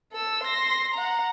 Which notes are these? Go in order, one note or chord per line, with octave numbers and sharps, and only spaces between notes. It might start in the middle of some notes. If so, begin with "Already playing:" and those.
A4 E6
C6 A#6
F#5 A#5